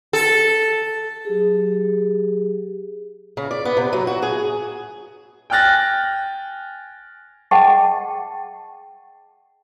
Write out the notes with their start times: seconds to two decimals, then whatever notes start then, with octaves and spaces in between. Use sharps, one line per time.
0.13 A4
1.25 F#3 G4 G#4
3.37 C#3
3.51 D5
3.65 B3
3.77 C3
3.93 F#3
4.07 F#4
4.22 G#4
5.50 G5 G#5 F6 F#6 A6 A#6
7.51 G#4 D#5 F#5 G5 A5 C#6